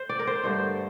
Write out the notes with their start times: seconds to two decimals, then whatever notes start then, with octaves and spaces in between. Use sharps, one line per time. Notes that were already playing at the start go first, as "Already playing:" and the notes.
Already playing: C5
0.09 D5
0.19 A#4
0.27 C5
0.44 G2 D3 A3 C5